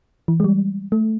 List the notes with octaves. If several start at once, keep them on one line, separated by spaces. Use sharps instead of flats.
E3
G#3
G3
A3